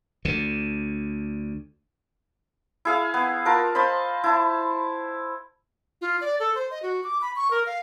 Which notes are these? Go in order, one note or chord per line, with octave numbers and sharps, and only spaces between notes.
D2 D3
E4 G#4 F5
B3
F4 A#4 A5
C5 D#5 A5 B5
E4 A5
F4
D5
A4
C5
D#5
F#4
D6
B5
C#6
A#4
F5